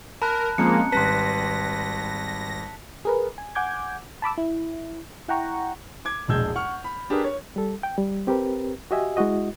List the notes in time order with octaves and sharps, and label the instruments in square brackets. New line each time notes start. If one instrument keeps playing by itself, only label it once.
[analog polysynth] A#4 [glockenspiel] A5 F#6 [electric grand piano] B5
[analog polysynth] F3 G#3 A#3 [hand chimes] C4 C#4 A#5 [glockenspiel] C#7
[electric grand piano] G#1 G3 B4 [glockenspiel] A5 B6 [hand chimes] C6 F#6 [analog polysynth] A#6
[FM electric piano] G#4 A#4 B4
G#5
F#5 G#5 D6 G6 G#6
A5 B5 D6 E6
E4
E4 F#5 G5 A#5 C#6
[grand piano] D6 G#6
E1 A#1 G#3 E6 G6 G#6
F#5 C#6 F6
B5
D4 G4 G#4 A#4 B4
C#5
[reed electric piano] G3 A4
G5
G3
C4 G4 A#4 B4
F#4 G4 D#5 E5 G#5
G#3 E4 F#4 D#5